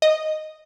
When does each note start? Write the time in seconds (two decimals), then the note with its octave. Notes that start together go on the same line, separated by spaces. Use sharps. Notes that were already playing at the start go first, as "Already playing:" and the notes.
0.02 D#5